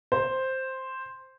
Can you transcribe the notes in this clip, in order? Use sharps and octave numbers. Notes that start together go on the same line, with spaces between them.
C5